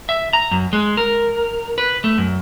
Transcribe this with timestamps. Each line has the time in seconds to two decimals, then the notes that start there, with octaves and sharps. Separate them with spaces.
0.09 E5
0.33 A#5
0.51 F#2
0.73 G#3
0.97 A#4
1.78 B4
2.04 A3
2.18 F#2